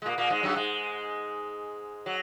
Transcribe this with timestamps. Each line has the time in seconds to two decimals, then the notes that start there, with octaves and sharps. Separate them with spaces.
0.02 G#3
0.06 A#2 A#3
0.18 A#2 A#3
0.30 G#2 G#3
0.43 F#2 F#3
0.56 G#2 G#3
2.06 F#3